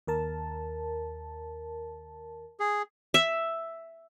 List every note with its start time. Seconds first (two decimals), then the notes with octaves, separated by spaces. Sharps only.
0.07 D#2 A#4 A5
2.60 G#4
3.14 E5